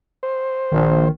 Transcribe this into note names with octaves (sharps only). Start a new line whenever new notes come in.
C5
A#1 D#3